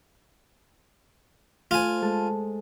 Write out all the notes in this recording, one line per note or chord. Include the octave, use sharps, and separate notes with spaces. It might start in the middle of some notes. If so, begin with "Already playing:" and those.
A3 F4 C5 G#5
G#3 A4 A5